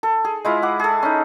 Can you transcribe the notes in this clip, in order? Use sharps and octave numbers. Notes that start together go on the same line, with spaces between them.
A4
G#4
G#3 E4 F4
F#5 D6
G#4 A4
C#4 D#4